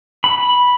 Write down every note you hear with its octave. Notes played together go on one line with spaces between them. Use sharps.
B5